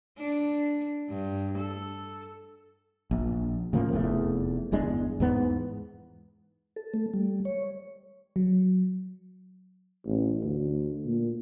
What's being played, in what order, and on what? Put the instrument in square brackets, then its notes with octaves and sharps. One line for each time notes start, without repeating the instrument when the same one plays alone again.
[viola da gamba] D4
G2
A4
[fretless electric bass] A#1
A2 C#3 F3 A#3
F1 E2 C3 A3
G1 E2 G#3 D4
E2 G#2 B3
[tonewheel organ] A4
A3
G3
C#5
[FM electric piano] F#3
[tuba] A1
D2
A#2